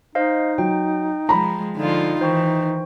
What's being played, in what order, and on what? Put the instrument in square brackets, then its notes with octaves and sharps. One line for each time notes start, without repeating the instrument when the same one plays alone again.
[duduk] D#4 [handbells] C5 D#5 F5
[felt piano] F#3 [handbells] G5
[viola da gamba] F3 G#3 [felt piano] A#5 B5
[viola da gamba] D3 F3 F4 [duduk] D#4
[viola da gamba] D#3 E3 [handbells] C5 G5 C#6